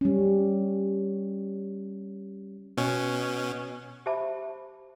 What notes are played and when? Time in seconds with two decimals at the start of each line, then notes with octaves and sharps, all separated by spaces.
0.01 G3 C#4
2.77 B2 C#4
4.06 G4 C5 E5 A5 B5 D6